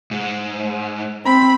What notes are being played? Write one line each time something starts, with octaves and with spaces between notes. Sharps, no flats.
G#2
C4 B5